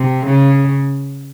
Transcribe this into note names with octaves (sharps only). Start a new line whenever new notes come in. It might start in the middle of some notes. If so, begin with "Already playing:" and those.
Already playing: C3
C#3